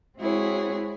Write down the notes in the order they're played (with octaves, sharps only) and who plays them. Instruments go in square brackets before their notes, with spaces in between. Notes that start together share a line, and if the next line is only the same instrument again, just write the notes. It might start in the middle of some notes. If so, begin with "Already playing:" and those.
[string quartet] G#3 C4 E4 F#4 G#4 C#5